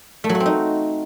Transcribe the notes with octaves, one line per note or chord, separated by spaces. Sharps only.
A3
F#3
F#4
C4
D#4